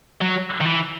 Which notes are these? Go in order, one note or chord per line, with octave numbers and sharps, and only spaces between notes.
F#3
D#3
E3